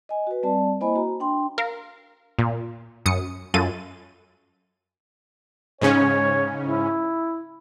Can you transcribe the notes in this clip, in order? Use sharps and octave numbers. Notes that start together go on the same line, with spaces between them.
D#5 G#5
F#4 B4
G3 C4 D5 A5
A#3 E4 C5 D#5 G#5 B5
F#4 A#5
D4 G5 C6
A#4 F5
A#2
F#2 D#6 C#7
F#2 F4 A4 A6 D#7
G#2 C#3 C#4 C#5
E4